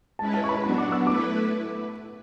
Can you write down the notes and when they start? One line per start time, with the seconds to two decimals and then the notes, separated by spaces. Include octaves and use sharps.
0.19 G#3 C#4 E4 B4 A5
0.34 A5
0.44 C#6
0.49 B5
0.63 F#3 B3 D4 F#4 B5
0.78 D6
0.92 E6
1.07 A3 E4 B4 D6